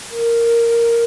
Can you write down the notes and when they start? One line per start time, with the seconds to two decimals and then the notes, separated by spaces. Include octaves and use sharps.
0.11 A#4